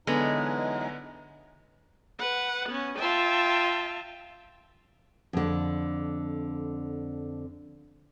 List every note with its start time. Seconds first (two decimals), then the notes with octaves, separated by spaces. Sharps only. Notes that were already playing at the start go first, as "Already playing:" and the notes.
0.07 D3 E3 F#3 G#3 B3 D#4
2.19 B4 F#5
2.69 B3 C#4
2.99 F4 E5 G5 A5
5.33 F2 D3